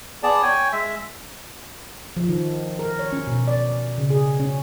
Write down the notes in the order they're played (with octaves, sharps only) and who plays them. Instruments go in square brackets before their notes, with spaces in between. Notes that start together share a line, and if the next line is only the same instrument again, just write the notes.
[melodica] B3 G#4 D5 A5
C#5 G5 G#5
G#3 E5
[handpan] F3
D#3
A#4
C#5
C#4
B2
D5
C#3
G#4
C#4